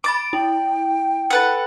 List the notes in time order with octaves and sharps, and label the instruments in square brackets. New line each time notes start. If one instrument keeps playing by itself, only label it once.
[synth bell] B5 A6 D7 [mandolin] D6
[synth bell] E4 [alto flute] G5
[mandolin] A4 B4 F#5